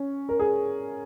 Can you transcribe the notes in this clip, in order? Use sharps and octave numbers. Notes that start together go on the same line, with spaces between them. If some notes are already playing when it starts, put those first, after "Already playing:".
Already playing: C#4
A#4
G#4